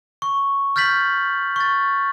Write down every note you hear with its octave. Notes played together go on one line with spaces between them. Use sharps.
C#6
F6 G6 A6 B6 F#7
C#6 A6